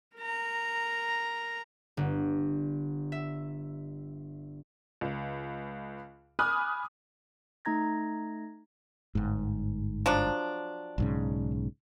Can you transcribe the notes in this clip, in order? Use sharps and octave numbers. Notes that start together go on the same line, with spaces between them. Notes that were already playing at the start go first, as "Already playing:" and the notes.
A#4 A#5
G1
E5
C#2
G#5 B5 D6 D#6 F6 F#6
A3 D#4 A#5 G#6 A#6
G1 G#2
F3 F#3 D4
B1 G#2 C#3